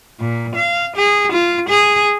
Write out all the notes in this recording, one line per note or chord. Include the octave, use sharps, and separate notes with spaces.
A#2
F5
G#4
F4
G#4